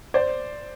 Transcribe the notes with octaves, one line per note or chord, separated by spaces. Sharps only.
C5 D5